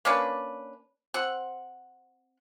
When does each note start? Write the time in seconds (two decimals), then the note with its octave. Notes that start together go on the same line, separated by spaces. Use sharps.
0.05 A#3 C#4 D4 B4
1.14 C4 F#5